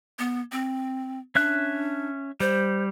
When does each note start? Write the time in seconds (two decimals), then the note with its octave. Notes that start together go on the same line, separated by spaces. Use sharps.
0.19 B3
0.52 C4
1.35 C#4 D4 E5 F#6
2.40 G3 C5